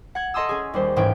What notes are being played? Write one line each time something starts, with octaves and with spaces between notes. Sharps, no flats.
F#5 G#6
A4 D#5 A5 C6 D#6 E6
C#4 G#4
D#2 G3 C5
A1 G#2 E3 C#4 G5